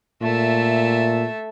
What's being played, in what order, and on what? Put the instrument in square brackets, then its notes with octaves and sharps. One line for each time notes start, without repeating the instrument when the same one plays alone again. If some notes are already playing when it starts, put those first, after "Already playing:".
[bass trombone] A#2 [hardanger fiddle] A3 E5